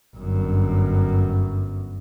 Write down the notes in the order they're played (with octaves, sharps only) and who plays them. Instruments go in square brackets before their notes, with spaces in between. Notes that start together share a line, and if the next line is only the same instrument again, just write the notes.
[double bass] G1 F#2